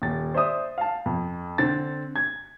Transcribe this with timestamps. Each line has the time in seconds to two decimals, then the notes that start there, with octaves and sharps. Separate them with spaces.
0.02 D#1 A6
0.34 C5 D5 E5 D#6
0.78 F5 A5
1.06 F2
1.58 D3 C4 A6
2.16 G#6